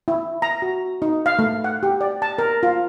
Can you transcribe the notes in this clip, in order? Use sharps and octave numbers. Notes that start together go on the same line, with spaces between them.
E4
A#5
F#4
D#4
F5
A3
F#5
G4
D5
A5
A#4
F4